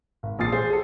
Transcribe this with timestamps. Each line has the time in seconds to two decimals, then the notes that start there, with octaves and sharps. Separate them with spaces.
0.23 G#1
0.39 A#1 A#2 F3 D#6 A6 C7
0.52 G#4 C5
0.70 G#4 A4